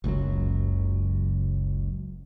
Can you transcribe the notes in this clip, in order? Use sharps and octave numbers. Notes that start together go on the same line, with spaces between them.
F#1 C#2 F#2 F#3